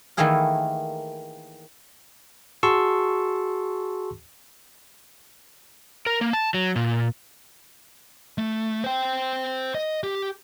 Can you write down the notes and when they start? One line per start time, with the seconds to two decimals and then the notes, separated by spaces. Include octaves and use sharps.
0.17 D#3 E3 A3 A#3 G#4 A#4
2.63 F#4 G#4 A5 C6 C#6 E6
6.06 A#4
6.21 A#3
6.33 A5
6.54 F#3
6.76 A#2
8.38 A3
8.84 C5 G5
9.75 D#5
10.03 G4